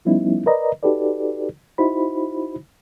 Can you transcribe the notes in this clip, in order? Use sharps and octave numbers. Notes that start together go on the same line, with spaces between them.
F3 G3 B3 C#4 D#4 E4
A#4 B4 D5 D#5 A#5
D#4 F#4 G4 A4 B4 D5
D#4 E4 F#4 C5 B5